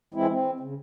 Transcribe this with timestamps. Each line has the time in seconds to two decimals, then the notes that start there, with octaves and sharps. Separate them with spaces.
0.14 E3 G#3 C4 E4
0.28 C4
0.60 C#3